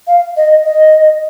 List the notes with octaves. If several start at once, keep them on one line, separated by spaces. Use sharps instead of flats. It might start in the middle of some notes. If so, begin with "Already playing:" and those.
F5
D#5
D#5